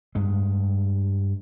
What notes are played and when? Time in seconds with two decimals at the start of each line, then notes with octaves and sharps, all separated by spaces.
0.15 G2 G#3